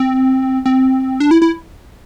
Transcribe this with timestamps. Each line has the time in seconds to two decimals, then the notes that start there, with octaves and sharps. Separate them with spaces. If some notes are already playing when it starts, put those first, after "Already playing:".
Already playing: C4
0.66 C4
1.20 D4
1.31 E4
1.42 E4